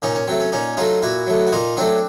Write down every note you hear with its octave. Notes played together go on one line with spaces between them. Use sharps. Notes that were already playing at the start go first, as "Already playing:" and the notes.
A#2 C#4 D#4
C#4
F#3 A3 C4
C#4
A#2 C#4 D#4
F#3 A3 D#4 F4
A#2 E4 F#4
F#3 A3
F#4
A#2 D#4 F4
F#3 A3 C4 D4